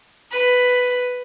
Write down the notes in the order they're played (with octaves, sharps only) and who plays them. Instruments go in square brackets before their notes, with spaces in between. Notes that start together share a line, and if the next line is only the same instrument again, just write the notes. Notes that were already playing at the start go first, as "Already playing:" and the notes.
[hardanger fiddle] B4